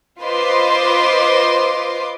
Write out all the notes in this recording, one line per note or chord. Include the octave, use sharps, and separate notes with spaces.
F4 B4 C5 D#5 C6 D6